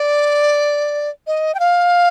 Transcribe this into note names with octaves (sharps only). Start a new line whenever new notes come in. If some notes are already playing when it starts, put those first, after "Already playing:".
Already playing: D5
D#5
G5
F5